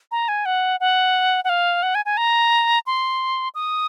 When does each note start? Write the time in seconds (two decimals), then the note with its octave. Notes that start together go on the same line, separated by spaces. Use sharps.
0.11 A#5
0.28 G#5
0.45 F#5
0.80 F#5
1.44 F#5
1.49 F5
1.83 F#5
1.95 G#5
2.05 G#5
2.17 A#5
2.87 C6
3.55 D#6